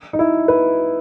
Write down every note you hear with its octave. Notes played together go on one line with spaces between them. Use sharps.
D#4
E4
B4